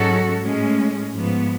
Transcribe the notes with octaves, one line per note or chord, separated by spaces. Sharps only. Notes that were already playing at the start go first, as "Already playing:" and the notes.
Already playing: G#2 F#3 C#4 F#4 A4
A2 G#3 C#4
G#2 F3 B3